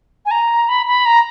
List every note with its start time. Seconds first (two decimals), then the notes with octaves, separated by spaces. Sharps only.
0.26 G#5
0.31 A#5
0.69 B5
0.87 B5
1.06 A#5